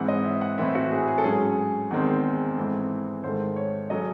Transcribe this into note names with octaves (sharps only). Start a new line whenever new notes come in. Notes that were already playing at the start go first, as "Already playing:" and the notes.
Already playing: G#2 E3 C4 F#5
D#5
E5
F#5
A2 E3 C4 E5
F#4
G#4
G#4
A4
G#2 F#3 C#4 G#4
E2 D#3 G#3 C4
G#2 E3 A3 C4
G#2 D#3 A3 C5
C#5
C#3 F#3 A3 C#4 D#5